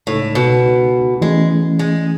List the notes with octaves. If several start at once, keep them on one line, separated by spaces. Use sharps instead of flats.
C#2 A2 C#3 G#3 D#4 A4
B2
E3 G#3 A3 C#4
G#3